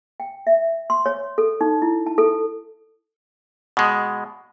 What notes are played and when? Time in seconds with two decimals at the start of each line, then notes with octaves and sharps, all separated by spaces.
0.20 G5
0.47 E5
0.90 C6
1.06 C#5
1.38 A4
1.61 D#4
1.82 E4
2.07 A5
2.18 A4
3.77 B2 G#3